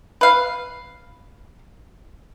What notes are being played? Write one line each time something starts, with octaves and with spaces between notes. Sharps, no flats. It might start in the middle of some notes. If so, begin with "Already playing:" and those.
B4 F5